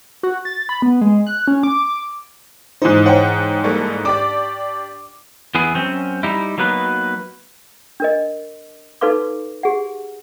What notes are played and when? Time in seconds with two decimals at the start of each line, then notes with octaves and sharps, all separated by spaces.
0.23 F#4
0.45 A6
0.69 B5
0.82 B3
1.01 G#3
1.26 F#6
1.48 C#4
1.63 D6
2.82 G#2 E3 D#4 C5
3.06 C5 C#5 F#5 G5
3.64 G3 A#3 A4 C#6
4.05 D4 G4 D5 D6
5.55 E2 B3 E4 G#4
5.75 F#2 C4 C#4
6.23 G3 D#4 E4
6.58 F#3 A#3 B3 D#4 B4
8.00 D4 A#4 D#5
9.01 D#4 A4 B4 F5 C6 D6
9.63 G4 G#4 F#5